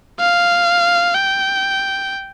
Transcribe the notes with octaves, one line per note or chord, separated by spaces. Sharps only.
F5
G5